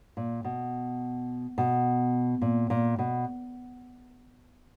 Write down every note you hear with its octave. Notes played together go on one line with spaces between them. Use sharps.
A#2
B2
B2
A#2
A#2
B2